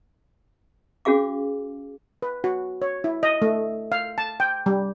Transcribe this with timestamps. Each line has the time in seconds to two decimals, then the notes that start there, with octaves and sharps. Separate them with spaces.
1.05 C#4 F#4 G#4 F5 D6
2.22 B4
2.44 F#4
2.82 C#5
3.04 E4
3.23 D#5
3.42 A3
3.92 F5
4.18 A5
4.40 G5
4.66 G3